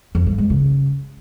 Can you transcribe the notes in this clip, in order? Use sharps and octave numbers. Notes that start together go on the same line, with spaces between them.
F2
G2
G#2
C#3